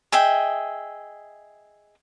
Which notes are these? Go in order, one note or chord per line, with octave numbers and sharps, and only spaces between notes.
G#4 D#5 E5 G5